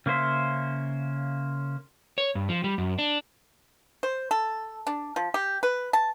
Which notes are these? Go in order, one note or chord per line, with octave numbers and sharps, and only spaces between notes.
C#3 A#3 C#4 C5 E5
C#5
G2
F3
G3
F#2
D4
C5
A4
D4
F3
G4
B4
A5